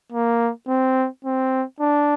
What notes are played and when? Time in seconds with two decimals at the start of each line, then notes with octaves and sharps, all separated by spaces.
0.12 A#3
0.68 C4
1.25 C4
1.80 D4